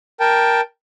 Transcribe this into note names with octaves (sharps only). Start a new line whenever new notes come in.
A#4 G5 A5